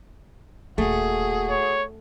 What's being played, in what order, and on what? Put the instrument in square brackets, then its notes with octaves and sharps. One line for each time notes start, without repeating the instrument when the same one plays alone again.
[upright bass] D#1 A#3 [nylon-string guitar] A3 [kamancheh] F#4 G#4
[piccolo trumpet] C#5